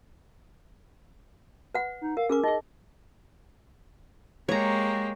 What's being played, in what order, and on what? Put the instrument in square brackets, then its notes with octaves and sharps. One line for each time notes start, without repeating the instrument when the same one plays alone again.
[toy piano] B4 F#5
[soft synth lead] D#4
[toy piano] A#4 [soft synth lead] F5
[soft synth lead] C#4 [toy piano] G#4 A#4 D6
[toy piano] D#4 G#4 [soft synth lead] D#5
[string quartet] G#3 A#3 G4 [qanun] C#5 A#5